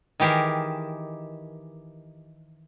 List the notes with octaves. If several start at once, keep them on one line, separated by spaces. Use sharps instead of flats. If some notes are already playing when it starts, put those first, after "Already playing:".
D#3 E3 G4 G#4 A#4